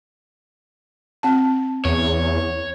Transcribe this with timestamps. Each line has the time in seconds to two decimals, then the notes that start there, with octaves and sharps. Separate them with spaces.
1.23 C4 A5
1.85 E2 C#5